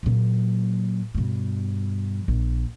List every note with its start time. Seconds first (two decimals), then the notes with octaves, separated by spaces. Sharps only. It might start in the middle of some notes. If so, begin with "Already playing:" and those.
0.03 A#2 F#3
1.15 G2 B2
2.28 A#1